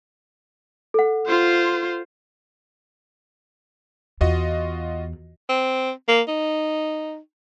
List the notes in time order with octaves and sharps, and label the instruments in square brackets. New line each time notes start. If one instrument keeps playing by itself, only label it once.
[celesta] A4 F#5
[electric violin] F4 C5
[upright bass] E2 [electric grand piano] F4 F#4 D#5
[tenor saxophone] C4
A#3
D#4